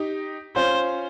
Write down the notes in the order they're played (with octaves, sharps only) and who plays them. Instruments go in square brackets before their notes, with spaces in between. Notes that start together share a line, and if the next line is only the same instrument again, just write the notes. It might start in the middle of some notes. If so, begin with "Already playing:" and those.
Already playing: [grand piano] D#4 G4
[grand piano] C#4 F4 [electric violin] C5